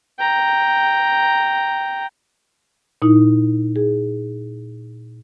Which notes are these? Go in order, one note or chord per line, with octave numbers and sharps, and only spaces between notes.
G5 A#5
A#2 D#4 E4
G#4